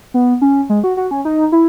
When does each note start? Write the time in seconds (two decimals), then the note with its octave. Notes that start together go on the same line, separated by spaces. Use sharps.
0.14 B3
0.42 C#4
0.70 G#3
0.84 F#4
0.97 F#4
1.11 C#4
1.25 D#4
1.52 E4